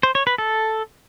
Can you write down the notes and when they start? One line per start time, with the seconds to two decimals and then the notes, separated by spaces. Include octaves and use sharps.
0.03 C5
0.15 C#5
0.27 B4
0.38 A4